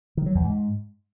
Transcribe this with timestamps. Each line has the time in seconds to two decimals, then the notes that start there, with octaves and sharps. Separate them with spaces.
0.17 D#3
0.26 F#3
0.35 E2
0.44 G#2